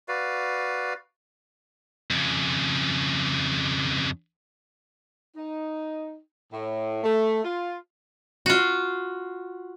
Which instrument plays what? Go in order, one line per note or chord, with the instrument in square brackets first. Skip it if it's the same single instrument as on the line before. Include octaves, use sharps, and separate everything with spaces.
[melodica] F#4 B4 D5 F5
[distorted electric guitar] F2 C#3
[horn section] D#4
A2
A3
F4
[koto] F4 F#4